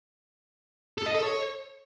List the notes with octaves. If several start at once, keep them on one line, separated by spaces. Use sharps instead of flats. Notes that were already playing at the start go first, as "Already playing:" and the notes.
A4
D#5
A4
C#5